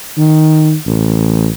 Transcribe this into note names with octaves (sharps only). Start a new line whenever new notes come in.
D#3
A1